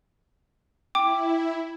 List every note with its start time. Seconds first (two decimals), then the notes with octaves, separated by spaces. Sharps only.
0.95 E4 G5 D6